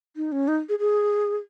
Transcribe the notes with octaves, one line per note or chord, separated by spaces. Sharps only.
D#4
C#4
D#4
G#4
G#4